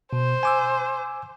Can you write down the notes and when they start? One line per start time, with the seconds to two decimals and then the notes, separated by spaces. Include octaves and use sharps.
0.13 B2 C5
0.43 G#5 D6 E6